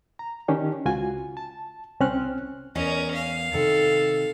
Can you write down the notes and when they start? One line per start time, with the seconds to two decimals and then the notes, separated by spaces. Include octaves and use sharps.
0.19 A#5
0.48 D#3 C#4 D4 G4
0.85 C#2 F4 F#4 G#5
1.37 A5
2.00 C2 C4 C#4 F6 F#6
2.75 E2 C#4 A#4 D#5
3.15 F5
3.53 C3 D#3 A4